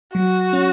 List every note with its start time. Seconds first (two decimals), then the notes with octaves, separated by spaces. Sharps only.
0.14 F#3 F#4
0.53 C#4